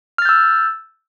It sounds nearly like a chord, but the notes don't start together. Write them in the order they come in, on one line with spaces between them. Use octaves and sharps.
F6 A6 G6 E6